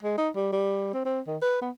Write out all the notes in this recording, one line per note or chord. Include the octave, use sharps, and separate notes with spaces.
G#3
D#4
G3
G3
C4
C4
D#3
B4
B3